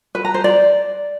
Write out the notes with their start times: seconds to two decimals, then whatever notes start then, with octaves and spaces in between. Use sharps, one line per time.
0.15 B4
0.25 A#5
0.34 C5
0.44 D5